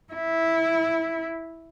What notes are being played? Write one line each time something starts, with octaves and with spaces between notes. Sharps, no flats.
E4